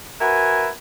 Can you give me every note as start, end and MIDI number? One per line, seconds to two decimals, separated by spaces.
0.20 0.68 66
0.20 0.68 70
0.20 0.68 71
0.20 0.68 76
0.20 0.68 78
0.20 0.68 80